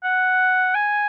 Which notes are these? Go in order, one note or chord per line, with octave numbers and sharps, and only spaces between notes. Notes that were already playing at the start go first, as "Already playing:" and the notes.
F#5
G#5